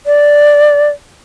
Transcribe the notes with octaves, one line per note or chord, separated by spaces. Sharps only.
D5